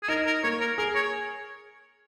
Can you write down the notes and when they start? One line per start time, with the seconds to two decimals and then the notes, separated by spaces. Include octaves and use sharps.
0.03 G#4
0.08 D#4 A#4
0.26 A#4
0.43 A#3 C#5
0.60 A#4
0.78 G#4 A#4
0.95 C#5